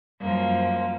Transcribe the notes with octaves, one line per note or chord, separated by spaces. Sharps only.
F#2 F3 G3 A#3